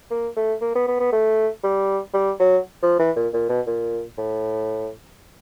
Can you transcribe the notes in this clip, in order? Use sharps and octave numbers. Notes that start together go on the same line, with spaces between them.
A#3
A3
A#3
B3
B3
B3
A3
G3
G3
F#3
F3
E3
A#2
A#2
B2
A#2
A2